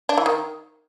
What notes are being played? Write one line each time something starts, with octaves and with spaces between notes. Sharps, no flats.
D4
E3
D#3